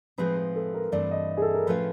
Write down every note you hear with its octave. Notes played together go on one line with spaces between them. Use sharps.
A2 F3 G#3 C4 D#4 B4
B4
A4
A#4
G2 E3 A3 C4 F4 D5
D#5
G#4
A4
A#4
A2 F3 A3 C#4 F4 B4